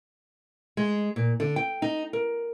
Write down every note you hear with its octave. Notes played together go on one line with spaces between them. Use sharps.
G#3
A#2
D3
G5
D#4
A#4